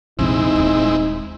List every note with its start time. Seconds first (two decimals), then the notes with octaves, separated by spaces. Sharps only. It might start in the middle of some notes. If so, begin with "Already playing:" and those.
0.19 A#1 F2 C3 G#3 C4 D#4 E4
0.55 D#1 G#1